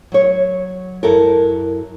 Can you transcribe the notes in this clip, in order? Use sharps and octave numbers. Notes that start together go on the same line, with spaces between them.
F#3 C#5
F#2 E4 F#4 A4 A#4